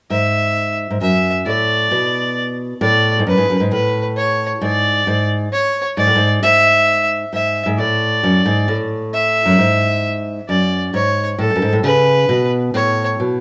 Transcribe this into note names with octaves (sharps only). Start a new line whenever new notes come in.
G#2 E5
G#2
F#2 E5
A2 D5
B2
A2 D5
G#2
F#2 B4
G#2
F#2
G#2
A2 B4
C#5
G#2 D5
G#2
C#5
G#2 D5
A2
G#2
G#2 E5
G#2 E5
G#2
A2 D5
F#2
G#2
A2
E5
F#2
G#2
F#2 D5
G#2 C#5
A2 A4
G#2
F#2
G#2
A2
C#3 B4
B2
A2 C#5
B2